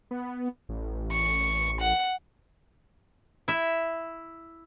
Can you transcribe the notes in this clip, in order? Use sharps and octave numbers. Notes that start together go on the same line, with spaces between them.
B3
A1
C#6
F#5
E4 E5